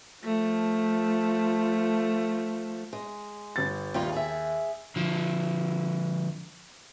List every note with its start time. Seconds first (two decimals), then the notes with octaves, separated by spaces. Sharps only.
0.24 F3 A3
2.93 G#3
3.56 G1 A6
3.94 D#2 G3 D#4 F4
4.12 G#4 E5
4.96 D3 F3